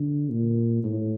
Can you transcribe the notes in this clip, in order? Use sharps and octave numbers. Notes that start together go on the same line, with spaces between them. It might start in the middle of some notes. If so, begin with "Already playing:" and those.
Already playing: D3
A#2
A2